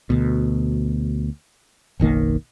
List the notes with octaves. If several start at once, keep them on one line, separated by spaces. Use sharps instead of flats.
D2 B2
F#1 B1 D#3 A#3